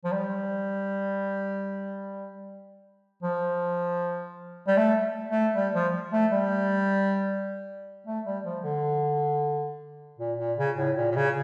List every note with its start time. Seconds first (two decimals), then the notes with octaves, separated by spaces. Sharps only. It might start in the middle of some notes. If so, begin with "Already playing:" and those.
0.04 F3
0.12 G3
3.23 F3
4.68 G3
4.77 A3
5.30 A3
5.55 G3
5.74 F3
6.13 A3
6.32 G3
8.07 A3
8.26 G3
8.45 F3
8.64 D3
10.19 A#2
10.39 A#2
10.58 C#3
10.78 A2
10.97 A#2
11.12 A#2
11.16 C#3